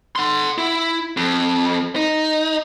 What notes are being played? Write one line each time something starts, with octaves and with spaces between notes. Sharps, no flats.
F#5 C6
E4
F2
D#4